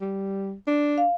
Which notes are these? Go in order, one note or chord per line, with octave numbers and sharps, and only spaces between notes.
G3
D4
F5